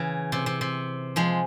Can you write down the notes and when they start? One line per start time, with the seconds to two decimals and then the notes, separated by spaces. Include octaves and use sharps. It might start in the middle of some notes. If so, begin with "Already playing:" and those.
Already playing: C#3 E3
0.32 C3
0.46 C3
0.61 C3
1.16 F3 G#3